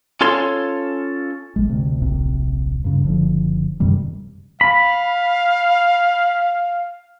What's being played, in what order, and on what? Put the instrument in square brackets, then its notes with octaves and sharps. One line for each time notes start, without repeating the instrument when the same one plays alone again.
[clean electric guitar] C#4 F4 A4 C#5 C6
[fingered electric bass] A1 G#3
D2 C3
D1 A#1 C3
G2 C#3
F#1 D3 F3
F#2 C3 D#3 G3
[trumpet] F5 [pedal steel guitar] B5